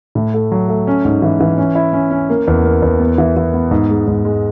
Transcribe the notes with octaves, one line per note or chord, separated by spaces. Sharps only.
A2
A3
F#3
A3
C#4
G#2
E3
E3
C#4
E4
C#4
C#4
A#3
E2
A#3
E2
B3
E3
E3
B3
G#2
G#3
G#2
G#3